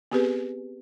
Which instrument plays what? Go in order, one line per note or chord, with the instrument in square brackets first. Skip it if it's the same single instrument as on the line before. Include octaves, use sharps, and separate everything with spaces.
[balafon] B3 C4 G4 G#4 B4